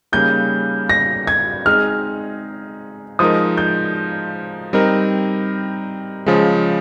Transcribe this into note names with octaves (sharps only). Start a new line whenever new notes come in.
C#3 G3 A#3 D#4 G6
A#6
G#6
G#3 C4 D#4 G#4 F6
F3 G#3 D#4 A#4 D#6
G6
G3 C4 D#4 A#4
C#3 F3 G#3